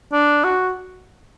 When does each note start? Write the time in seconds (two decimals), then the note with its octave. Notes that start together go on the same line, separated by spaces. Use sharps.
0.13 D4
0.44 F#4